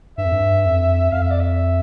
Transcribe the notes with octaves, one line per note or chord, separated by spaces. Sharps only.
G2 E5
F2
G2
F2
F2 F5
E5
D5
E5